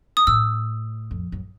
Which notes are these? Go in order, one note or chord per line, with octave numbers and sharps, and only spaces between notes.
D#6
A2 E6
F2
F#2